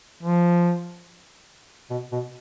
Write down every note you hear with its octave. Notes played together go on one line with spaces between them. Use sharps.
F3
B2
B2